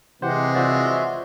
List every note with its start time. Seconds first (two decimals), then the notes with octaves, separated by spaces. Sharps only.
0.22 C3 E3 G#3 G4 C5 F#5
0.55 F4 F#4 C5 D5 E5